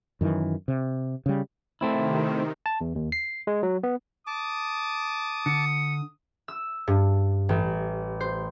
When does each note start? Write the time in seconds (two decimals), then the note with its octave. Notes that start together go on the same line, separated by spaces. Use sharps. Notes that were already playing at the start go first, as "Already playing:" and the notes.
0.21 F#2 D#3 E3
0.68 C3
1.26 C#3 G3
1.81 C3 D#3 A3 C4 E4
2.66 A5
2.81 E2
2.95 D#2
3.12 C7
3.47 G#3
3.63 F#3
3.83 B3
4.27 A5 D6 D#6
5.46 D3 C#7
6.48 E6
6.87 G2
7.49 A1
8.20 C5